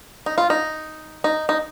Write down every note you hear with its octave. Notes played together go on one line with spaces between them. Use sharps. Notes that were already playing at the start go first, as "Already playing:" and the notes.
D#4
F4
D#4
D#4
D#4